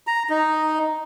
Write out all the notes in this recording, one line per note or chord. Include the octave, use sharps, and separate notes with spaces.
A#5
D#4